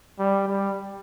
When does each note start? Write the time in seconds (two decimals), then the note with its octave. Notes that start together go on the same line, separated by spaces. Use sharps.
0.19 G3
0.48 G3